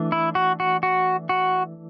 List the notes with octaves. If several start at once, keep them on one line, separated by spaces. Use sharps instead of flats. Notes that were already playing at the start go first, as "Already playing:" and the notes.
Already playing: E3 A3 D4
E4
F#4
F#4
F#4
F#4